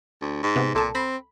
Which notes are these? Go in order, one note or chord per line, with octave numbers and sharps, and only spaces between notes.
D2
G#2
C3 B3
C2 A#2 A4 A5
C4 B5